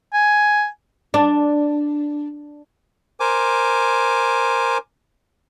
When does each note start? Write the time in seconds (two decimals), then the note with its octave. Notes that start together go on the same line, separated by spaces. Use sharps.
0.13 G#5
1.14 D4
3.20 A#4 C5 G#5 D6